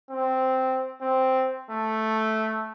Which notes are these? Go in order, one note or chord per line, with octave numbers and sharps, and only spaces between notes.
C4
C4
A3